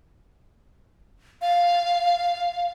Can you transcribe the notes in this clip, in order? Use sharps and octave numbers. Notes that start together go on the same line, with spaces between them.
F5